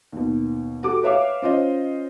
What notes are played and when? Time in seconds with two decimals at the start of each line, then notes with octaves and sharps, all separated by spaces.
0.12 D#2 B2
0.83 F#4 G4 A4 D6
1.03 B4 C#5 E5 F5 D6
1.42 C#4 F4 C5 D#5